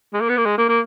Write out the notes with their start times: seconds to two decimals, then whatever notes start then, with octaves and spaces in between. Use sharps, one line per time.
0.13 G#3
0.21 A#3
0.29 B3
0.37 A#3
0.46 G#3
0.58 A#3
0.69 A#3